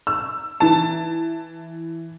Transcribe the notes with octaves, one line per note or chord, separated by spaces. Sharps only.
E6
E3 A5